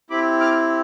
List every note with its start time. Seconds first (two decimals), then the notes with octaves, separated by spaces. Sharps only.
0.10 C4 E4 G4 B5 D6
0.41 D6 F6